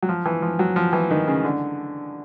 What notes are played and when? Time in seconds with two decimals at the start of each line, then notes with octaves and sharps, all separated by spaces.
0.03 F#3
0.09 F3
0.26 E3
0.42 F3
0.59 F#3
0.76 F3
0.93 E3
1.11 D#3
1.28 C#3
1.45 D3